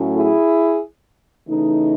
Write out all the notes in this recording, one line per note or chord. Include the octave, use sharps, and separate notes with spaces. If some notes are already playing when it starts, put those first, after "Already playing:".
Already playing: A2 F#3 A3 C#4
E4 G#4
C#3 E3 A3 D#4